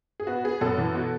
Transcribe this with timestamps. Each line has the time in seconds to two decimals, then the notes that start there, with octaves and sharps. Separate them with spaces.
0.20 G#4
0.27 B3 F#4
0.44 B3 G#4
0.61 F#2 A4
0.78 E3
0.94 B2